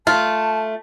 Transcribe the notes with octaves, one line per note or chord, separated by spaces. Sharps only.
A3 F4 A5